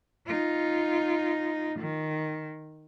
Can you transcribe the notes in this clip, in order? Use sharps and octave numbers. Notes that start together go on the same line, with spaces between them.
D#4 F4
D#3